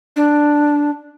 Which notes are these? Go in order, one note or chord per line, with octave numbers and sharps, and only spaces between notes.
D4